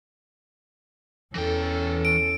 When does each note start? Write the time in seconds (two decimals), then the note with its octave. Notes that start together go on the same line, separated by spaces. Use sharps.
1.35 E2 E3 C#4 A4 G5
2.05 D7